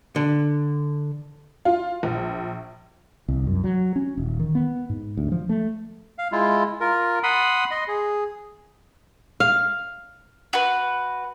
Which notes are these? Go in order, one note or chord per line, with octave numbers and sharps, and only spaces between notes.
D3
F4
A#1
C2
F#2
F#3
C#4
D#1
D#3
B3
G#2
D2
F3
A3
F5
G#3 E4 F4
F4 A#4
F#5 B5 C6 D#6
D#5 C6
G#4
F5
F#4 B4